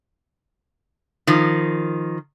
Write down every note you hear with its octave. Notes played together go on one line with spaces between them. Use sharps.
D#3 F3